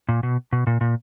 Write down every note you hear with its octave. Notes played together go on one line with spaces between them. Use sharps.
A#2
B2
B2
A#2
A#2